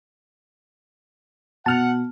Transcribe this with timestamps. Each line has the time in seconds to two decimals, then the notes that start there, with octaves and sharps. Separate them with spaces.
1.66 B2 F#5 A5 F6